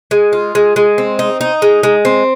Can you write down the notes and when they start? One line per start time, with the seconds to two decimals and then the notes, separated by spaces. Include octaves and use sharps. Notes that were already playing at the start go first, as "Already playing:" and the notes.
0.11 G#3
0.33 F4
0.55 G#3
0.76 G#3
0.98 C4
1.19 D#4
1.41 D#4
1.62 G#3
1.83 G#3
2.05 C4